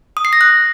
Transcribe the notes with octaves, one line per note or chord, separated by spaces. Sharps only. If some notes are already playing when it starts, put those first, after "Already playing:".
D#6
C7
A#6
F#6